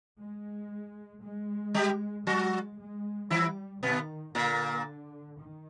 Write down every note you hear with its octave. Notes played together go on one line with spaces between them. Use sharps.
G#3
G#3
G3 G4
F#3 G#3 F#4
G#3
E3 G3 E4
B2 D#3 B3
A#2 D3 A#3
D#3